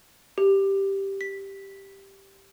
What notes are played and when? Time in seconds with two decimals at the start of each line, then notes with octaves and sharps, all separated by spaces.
0.38 G4
1.21 B6